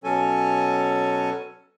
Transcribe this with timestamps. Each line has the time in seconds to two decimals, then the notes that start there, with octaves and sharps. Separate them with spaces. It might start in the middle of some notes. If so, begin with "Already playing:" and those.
0.04 B2 F#3 C#4 A4 G#5